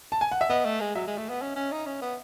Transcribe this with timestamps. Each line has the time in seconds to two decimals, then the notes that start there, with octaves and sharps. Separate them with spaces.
0.12 A5
0.21 G#5
0.31 F#5
0.41 E5
0.50 B3 D#5
0.65 A3
0.80 G#3
0.95 F#3 E5
1.07 G#3
1.18 A3
1.29 B3
1.41 C#4
1.56 C#4
1.72 D#4
1.86 C#4
2.01 B3